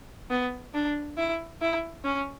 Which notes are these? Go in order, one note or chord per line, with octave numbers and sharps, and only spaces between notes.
B3
D4
E4
E4
C#4